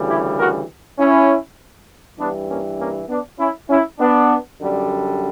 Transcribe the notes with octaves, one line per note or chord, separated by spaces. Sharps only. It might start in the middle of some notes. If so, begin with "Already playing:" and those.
Already playing: D2 C#3 E3 G3
E4 G4
F#4 A#4
C#4 E4
G2 E3 G3 B3 D4
A#3 C#4
A#3 C#4
B3 D4
C#4 E4
C#4 E4
B3 D4
F#2 D3 G3